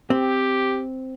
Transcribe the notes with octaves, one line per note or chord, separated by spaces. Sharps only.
C4 G4